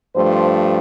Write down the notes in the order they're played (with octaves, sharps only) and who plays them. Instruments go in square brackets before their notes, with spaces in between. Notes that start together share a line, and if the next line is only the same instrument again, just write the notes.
[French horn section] G2 F3 A3 C5